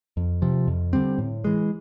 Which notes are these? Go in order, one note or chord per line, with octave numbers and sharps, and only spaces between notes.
F2
C3 F3
F2
D3 G3 C4
A2
E3 G#3